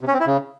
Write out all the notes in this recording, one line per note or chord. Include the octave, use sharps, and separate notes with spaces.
C3
C#4
C4
E4
C#3